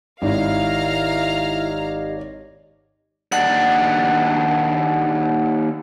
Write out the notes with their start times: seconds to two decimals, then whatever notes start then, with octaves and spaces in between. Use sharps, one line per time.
0.22 G#1 E4 G4 C#5 D#5 F5 A#5 F6
3.32 D#2 D4 F#5